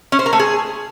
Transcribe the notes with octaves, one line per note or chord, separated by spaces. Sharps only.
C#4
C5
A#4
A3
G#4